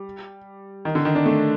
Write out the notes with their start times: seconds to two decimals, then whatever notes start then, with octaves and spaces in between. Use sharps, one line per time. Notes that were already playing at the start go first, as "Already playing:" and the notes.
Already playing: G3
0.85 D#3
0.95 D3
1.05 D#3
1.15 D4
1.26 A3